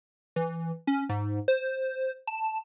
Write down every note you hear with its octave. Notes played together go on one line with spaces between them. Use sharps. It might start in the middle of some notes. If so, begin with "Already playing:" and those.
E3
C#4
G#2
C5
A5